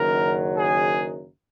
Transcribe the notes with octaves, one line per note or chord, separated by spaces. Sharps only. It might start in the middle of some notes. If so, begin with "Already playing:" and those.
Already playing: F#1 F#2 D#3 F#3 A#4
G#4